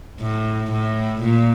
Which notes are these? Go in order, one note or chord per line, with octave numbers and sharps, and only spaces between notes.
A2
A2
A#2